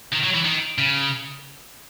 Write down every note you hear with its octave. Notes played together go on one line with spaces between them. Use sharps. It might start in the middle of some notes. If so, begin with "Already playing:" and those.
D#3
F#3
E3
D#3
C#3